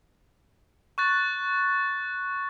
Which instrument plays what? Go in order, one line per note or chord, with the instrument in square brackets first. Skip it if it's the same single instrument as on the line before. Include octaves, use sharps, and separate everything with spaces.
[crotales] C#6 F#6 A6